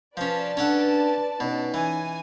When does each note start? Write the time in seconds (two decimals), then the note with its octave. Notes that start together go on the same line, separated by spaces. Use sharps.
0.17 F3 C#4 B4 D5 A5
0.57 C#4 D4 A4 F#5
1.40 B2 C#4 D#4
1.74 E3 G#5